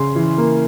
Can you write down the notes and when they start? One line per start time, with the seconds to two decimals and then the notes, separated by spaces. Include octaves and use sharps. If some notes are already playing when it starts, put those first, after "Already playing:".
Already playing: C#3 C6
0.16 E3
0.38 A#3